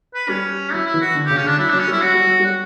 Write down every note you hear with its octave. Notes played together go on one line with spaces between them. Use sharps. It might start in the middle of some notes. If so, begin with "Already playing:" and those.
B4
G3 C#4
F#3 E4
E4
E3
F#4
D3
C#3 G4
C#4
D3
D4
F#3 E4
F#3 D4
C#4
G3
E4
F#3 F#4
G3
F#3
G3
F#4